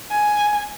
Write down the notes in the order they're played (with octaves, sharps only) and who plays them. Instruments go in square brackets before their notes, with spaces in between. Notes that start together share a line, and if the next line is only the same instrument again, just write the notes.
[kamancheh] G#5